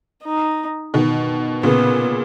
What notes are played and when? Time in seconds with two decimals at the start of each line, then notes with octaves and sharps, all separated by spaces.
0.24 D#4
0.94 B2 D#3
1.63 A#2 C#3 B3